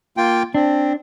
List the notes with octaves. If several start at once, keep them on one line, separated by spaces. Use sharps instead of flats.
A#3 F4 G5
C4 D4